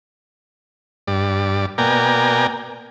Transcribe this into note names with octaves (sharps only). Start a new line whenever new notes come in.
G2 D5
B2 A#3 D5 G5 G#5 A#5